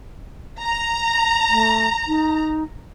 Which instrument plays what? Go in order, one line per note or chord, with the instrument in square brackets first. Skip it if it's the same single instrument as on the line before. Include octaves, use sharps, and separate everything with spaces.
[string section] A#5
[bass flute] A3
D#4